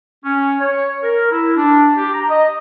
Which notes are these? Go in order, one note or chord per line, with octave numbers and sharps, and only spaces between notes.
C#4
C#5
A#4
E4
D4
G4
A#5
D#5